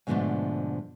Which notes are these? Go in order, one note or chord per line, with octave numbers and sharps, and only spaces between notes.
G#2 B2 D3 F3 A3 D4